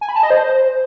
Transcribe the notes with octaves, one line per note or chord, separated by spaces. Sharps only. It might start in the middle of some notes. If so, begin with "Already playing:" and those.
G#5
B5
A5
D#5
C5